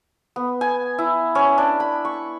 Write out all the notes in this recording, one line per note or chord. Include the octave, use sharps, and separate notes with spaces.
B3
G#5
E4
C#4
D4
B5
C#6